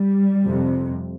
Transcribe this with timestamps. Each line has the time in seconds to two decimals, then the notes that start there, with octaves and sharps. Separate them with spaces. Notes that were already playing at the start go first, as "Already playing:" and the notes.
Already playing: G3
0.46 F2 C3